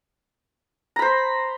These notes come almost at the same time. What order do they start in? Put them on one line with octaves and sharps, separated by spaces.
A#5 B5 C5